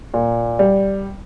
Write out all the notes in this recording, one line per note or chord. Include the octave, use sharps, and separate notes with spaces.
A#2
G3